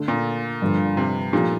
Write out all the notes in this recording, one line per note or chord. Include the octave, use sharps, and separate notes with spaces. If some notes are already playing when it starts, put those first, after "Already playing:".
Already playing: D3 A3 D4
A#2
G2 D3 F3
C3
A#2 F3 A3 D#4 G4